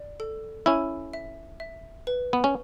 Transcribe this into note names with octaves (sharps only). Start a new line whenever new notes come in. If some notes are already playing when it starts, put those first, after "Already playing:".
Already playing: D5
A4
C#4 E4 G#5
E5
E5
B4
B3
C#4